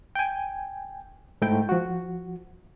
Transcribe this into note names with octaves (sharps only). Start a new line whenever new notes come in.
G5 G#5
G#2 A3 E4 G5
F3 F#4